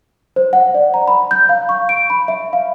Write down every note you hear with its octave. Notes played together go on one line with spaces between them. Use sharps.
C5
F#5
D5
A#5
B5
G6
F5
C#6
D7
B5
E5
F5